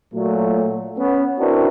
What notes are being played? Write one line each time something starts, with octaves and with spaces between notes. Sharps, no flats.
A#2 F#3 A3
B3 C#4
C4 D4 E4 F#4 A#4 B4